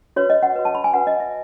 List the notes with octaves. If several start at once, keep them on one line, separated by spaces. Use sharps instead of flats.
F#4 B4 C#5
D#5
F#5
F#4 B4
A5
B5
G#5
F#4 B4 F#5
D#5
E5